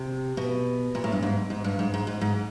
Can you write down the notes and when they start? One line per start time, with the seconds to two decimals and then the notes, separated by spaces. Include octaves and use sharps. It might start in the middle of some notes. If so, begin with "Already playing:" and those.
Already playing: C3
0.37 B2
0.95 A#2
1.04 A2
1.12 G2
1.22 G#2
1.50 G#2
1.64 G2
1.79 G#2
1.94 G#2
2.07 G#2
2.21 G#2